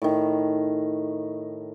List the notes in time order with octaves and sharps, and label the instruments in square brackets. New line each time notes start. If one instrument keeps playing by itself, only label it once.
[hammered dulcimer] A2 D#3